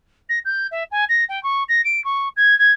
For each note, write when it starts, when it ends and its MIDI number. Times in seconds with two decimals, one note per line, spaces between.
0.29 0.39 94
0.45 0.67 91
0.71 0.84 76
0.91 1.05 80
1.09 1.25 94
1.29 1.42 79
1.43 1.64 85
1.69 1.81 94
1.85 2.03 98
2.05 2.29 85
2.37 2.57 92
2.59 2.72 92